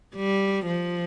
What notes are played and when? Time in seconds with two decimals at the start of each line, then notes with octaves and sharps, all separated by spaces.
0.16 G3
0.66 F3